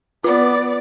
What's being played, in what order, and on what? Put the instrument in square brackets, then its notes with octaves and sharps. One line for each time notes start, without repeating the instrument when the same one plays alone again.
[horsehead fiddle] B3 D5 [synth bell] F4